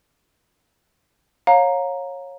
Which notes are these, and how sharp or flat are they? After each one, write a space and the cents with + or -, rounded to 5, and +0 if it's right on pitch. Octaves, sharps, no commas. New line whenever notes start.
C#5 -15 F5 +30 A#5 +0